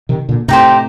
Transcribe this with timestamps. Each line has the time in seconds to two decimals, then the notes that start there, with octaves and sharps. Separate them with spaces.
0.09 C3 D#3
0.29 A#2 D3
0.48 A2 C3 D#4 G4 C5